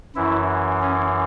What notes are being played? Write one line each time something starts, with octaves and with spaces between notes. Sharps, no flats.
F#2 E3 E4
C#4